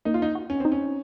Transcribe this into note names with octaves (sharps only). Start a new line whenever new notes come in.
A#3 D#4
F4
D#4
F#4
C#4
C4 D#4
C#4